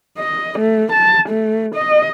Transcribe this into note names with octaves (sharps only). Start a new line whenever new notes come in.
D#5
A3
A5
A3
D#5